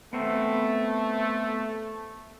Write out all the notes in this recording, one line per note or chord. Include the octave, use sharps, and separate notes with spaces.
A3 B3 C4 E5